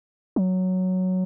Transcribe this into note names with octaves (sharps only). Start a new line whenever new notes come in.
F#3